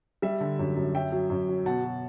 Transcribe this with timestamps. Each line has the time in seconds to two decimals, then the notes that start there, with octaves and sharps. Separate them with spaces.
0.22 G3 E5
0.41 D3
0.59 F#2
0.76 F#2
0.94 F#3 E5 G5
1.12 F#3
1.30 F#2
1.49 F#3
1.66 B2 F#5 A5
1.85 F#3